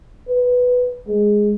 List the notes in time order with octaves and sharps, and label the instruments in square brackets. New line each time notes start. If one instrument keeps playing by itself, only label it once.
[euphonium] B4
G#3